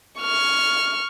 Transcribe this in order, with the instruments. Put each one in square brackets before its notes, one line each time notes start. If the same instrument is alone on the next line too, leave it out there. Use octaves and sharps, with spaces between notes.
[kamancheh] C#6 F6